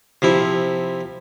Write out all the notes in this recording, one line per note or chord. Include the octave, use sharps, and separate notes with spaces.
C3 F3 E4